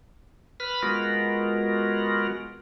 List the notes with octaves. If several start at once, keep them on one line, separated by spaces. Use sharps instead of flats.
B4 B5 F6
G#3 B3 F4 F#4 A#4